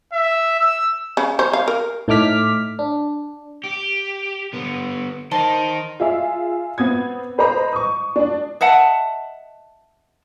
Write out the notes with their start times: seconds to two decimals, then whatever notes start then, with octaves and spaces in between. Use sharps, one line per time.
0.13 E5
0.60 E6
1.17 C#3
1.39 C5
1.53 F5
1.68 A#4
2.08 A2 A3 D#4 D6 F6 B6
2.79 D4
3.64 G4
4.53 D3 B3
5.31 D#3 D#4 C5 A5 C6
6.00 F4 G#4 E5
6.78 B3 C4 D#6 G#6
7.38 B4 C5 D#5 A#5 B5
7.73 C#6 D#6
8.16 D4 D5
8.61 D#5 E5 F#5 A5